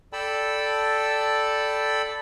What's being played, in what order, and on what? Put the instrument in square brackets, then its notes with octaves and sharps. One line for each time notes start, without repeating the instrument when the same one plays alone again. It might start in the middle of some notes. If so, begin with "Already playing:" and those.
[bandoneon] A4 D5 G5 A5 B5 E6